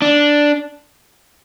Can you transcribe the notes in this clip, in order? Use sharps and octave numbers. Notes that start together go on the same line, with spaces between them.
D4